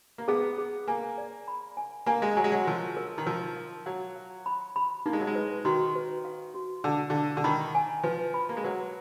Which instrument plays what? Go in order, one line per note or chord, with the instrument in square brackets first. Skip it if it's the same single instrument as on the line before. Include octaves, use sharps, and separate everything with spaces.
[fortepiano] A#3
[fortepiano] B3 [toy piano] G#4
[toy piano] G#4
[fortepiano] A#3 [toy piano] G#5
[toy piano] D5
B5
G#5
[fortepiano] A#3 [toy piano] G#5
[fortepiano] G#3
[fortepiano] F#3 [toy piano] G#5
[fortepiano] G#3
F#3
[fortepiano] F3 [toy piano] A#4
[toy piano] A#4
[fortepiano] D#3
[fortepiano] F3 [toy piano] A#4
[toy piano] F5
[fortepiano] F#3 [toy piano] F5
[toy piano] F5
B5
B5
[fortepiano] A#3 [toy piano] D#4
[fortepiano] G#3
F#3
G#3
[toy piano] B4
[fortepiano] D#3 [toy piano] F#4
[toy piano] B4
F5
F#4
[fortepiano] D3 [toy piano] F5
[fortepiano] D3 [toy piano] F5
[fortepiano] D3
[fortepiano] D#3 [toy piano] B5
[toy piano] G#5
[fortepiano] F3 [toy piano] B4
[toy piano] B5
[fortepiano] A#3
G#3
[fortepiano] F#3 [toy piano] B4